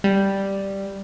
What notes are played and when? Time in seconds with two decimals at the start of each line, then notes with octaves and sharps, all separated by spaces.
0.04 G3